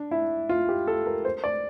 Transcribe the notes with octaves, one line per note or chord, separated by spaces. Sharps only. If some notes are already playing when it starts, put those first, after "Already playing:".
Already playing: D4
E4
F4
G4
A4
A#4
C5
D5